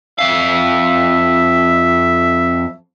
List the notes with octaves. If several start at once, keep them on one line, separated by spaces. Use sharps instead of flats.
F2 E5 F5